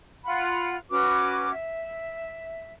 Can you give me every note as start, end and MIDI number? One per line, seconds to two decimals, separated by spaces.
0.25 0.76 65
0.25 0.76 78
0.25 0.76 83
0.25 0.76 90
0.90 1.51 61
0.90 1.51 66
0.90 1.51 71
0.90 1.51 86
1.51 2.72 76